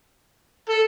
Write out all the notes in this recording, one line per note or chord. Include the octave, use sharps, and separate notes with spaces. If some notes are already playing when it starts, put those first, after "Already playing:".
A4